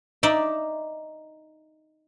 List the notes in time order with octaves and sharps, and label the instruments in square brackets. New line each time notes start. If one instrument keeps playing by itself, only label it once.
[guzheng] D#4 D5 E5